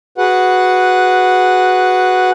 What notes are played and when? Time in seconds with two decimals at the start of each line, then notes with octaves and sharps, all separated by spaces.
0.18 F#4 G#4 B4 F#5